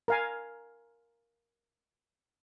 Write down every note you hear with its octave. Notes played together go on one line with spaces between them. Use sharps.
A#4 F5 G#5